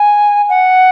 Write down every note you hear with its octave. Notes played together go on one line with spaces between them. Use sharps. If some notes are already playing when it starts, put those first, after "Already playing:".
Already playing: G#5
F#5